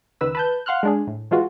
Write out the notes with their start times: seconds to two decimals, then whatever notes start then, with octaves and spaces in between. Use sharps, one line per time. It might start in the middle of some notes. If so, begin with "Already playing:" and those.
0.21 C#2 D#3 B4 E6
0.35 B4 A5 G6
0.66 F5 F#5 C6 F6 F#6
0.83 G#3 D4 G#4
1.07 A2
1.31 E3 G#3 F4 F#4